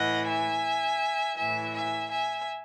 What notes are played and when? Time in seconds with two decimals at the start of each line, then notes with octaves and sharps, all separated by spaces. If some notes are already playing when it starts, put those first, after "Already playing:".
Already playing: A2 E3 D#5 F#5
0.27 E5 G#5
1.37 A2 E3 E5 G#5
1.74 E5 G#5
2.11 E5 G#5